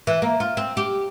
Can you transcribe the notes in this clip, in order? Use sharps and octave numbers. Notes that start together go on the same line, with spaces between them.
E3
A#3
F4
C4
G4